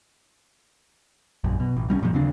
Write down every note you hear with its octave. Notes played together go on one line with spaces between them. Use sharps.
A#1 F#2
B2
A1
C2 G3 C4 C#4
F#2 A#2 F3
D#2 C#3 C4 D4